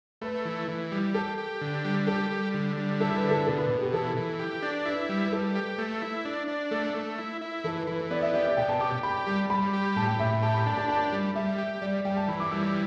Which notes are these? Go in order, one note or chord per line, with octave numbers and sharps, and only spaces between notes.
A3 B4
E3
E3
G3
G4 A4
G4
D3
G3
G4 A4
G3
D3
G3
E4 A4
B4
D3
A4
B2 A4
B4
B2
G4
E3 A4
E3
G4
D4
E4 B4
G3
B4
G3 A4
G4
A3
E4
D4
D4
A3 A4
A3
E4
E4
E3 A4
B4
E3 B4
B4
B3 D5
E5
G4 D5
D5
B2 G5
A5
G4 D6
G4 B5
G3
G3 B5
G4
A2 A5
G5
A2 E5
G4 A5
B5
D4 A5
A5
G4 A5
G3
G3 E5
G4
G3 D5
G3 G5
A5
E3 B5
D6
G3 E6
D6